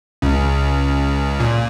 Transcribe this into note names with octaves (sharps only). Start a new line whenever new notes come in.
C#2 C#3
A#2